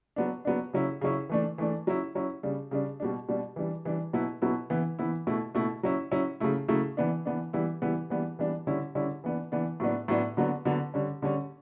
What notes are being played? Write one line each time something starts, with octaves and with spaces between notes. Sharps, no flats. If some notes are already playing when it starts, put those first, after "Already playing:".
F#3 B3 D4
F#3 B3 D4
C#3 F#3 C#4 E4
C#3 F#3 C#4 E4
E3 A3 D4
E3 A3 D4
F#3 C#4 E4
F#3 C#4 E4
C#3 G3 D4
C#3 G3 D4
B2 G3 D4
B2 G3 D4
E3 G3 D4
E3 G3 D4
B2 F#3 B3 E4
B2 F#3 B3 E4
E3 B3 E4
E3 B3 E4
B2 A3 E4
B2 A3 E4
F#3 C#4 E4
F#3 C#4 E4
C#3 F#3 A3 E4
C#3 F#3 A3 E4
E3 B3 D4
E3 B3 D4
E3 G3 B3 E4
E3 G3 B3 E4
E3 G3 B3 D4
E3 G3 B3 D4
D3 G3 C#4 E4
D3 G3 C#4 E4
E3 B3 D4
E3 B3 D4
A2 F#3 B3 D4
A2 F#3 B3 D4
D3 F#3 B3 D4
D3 F#3 B3 D4
D3 G3 C#4
D3 G3 C#4